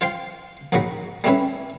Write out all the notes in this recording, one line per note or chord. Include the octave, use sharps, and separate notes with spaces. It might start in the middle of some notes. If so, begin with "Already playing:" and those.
F4 C5 F5 G5 C6
A#1 G#2 D#3 F#3 F#4 B5
G3 A3 C4 C#4 E4 B4